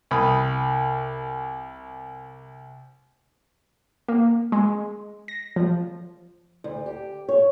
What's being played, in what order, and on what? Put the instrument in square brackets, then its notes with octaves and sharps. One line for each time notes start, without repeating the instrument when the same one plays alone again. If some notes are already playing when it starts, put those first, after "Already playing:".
[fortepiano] C2 B5 D#6
[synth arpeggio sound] A#3
G#3
A#6
F3
[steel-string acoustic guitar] D2
G4
C#5